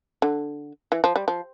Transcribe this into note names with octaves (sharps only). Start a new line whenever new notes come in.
D3
E3
F3
G3
F3